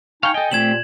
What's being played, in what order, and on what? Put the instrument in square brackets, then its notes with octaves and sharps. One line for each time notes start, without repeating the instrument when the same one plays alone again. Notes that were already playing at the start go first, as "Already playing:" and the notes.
[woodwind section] D#4 G#5 C#6 [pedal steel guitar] F5 G5
[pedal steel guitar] A4 G5 [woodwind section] D#5 G#5
[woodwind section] A#2 [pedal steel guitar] A3 C4 G4 [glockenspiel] G#6 E7 F#7